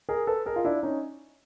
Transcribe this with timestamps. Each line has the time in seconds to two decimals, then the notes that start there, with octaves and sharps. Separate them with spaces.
0.09 G#4 A#4
0.27 A4 B4
0.46 G#4 A#4
0.56 F4
0.65 D4 E4
0.83 C#4 D#4